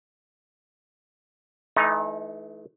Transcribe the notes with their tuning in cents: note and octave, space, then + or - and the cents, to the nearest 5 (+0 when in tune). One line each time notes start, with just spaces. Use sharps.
E3 +0 A3 -40 D#4 +0